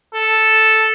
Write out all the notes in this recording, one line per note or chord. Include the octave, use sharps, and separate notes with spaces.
A4